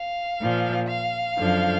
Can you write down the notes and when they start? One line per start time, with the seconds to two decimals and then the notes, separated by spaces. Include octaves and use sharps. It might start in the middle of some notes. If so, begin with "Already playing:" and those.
Already playing: F5
0.39 A#2 F3
0.87 F5
1.37 F#2 D3 F3